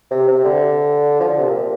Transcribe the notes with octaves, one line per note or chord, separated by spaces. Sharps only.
C3
C3
D3
F3
D3
C3
A#2